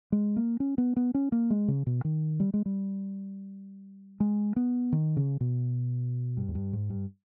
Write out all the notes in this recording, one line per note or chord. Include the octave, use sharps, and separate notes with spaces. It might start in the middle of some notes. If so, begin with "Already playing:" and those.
G#3
A#3
C#4
B3
B3
C#4
A#3
G#3
C#3
B2
D#3
G3
G#3
G3
G#3
B3
D#3
C#3
B2
G2
E2
G2
G#2
G2